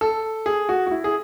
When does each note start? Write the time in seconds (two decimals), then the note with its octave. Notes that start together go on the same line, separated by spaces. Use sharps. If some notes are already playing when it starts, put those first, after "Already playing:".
0.01 A4
0.46 G#4
0.69 F#4
0.87 F#4
0.91 E4
1.04 G#4